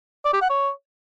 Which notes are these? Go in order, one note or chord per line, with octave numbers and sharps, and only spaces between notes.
D5
G4
F#5
C#5